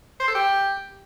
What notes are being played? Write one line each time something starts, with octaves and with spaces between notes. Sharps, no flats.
C5
A4
G4